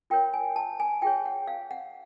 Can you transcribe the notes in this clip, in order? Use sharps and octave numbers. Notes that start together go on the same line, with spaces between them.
F4 A#4 C#5 G5
G#5
A5
G#5
F4 G#4 C#5 G5
F#5
F5
F#5